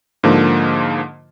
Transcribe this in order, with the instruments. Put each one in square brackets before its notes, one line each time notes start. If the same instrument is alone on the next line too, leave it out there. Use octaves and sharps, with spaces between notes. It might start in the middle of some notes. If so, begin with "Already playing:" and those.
[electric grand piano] G#2 D3 F3 A#3